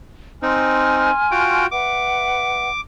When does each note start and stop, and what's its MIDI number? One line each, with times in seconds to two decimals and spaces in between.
0.42 1.11 60
0.42 1.11 63
0.42 1.65 80
0.42 1.65 84
0.42 1.65 89
1.31 1.66 65
1.31 1.66 66
1.31 1.66 79
1.71 2.69 71
1.71 2.69 76
1.71 2.69 78
1.71 2.81 86